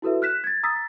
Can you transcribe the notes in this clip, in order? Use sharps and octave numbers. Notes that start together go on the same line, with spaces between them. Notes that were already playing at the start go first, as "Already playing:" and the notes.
E4 F#4 A4 B4 E5
F6 F#6 B6 E7
G#6 A6
A#5 D#6 E6 A6 B6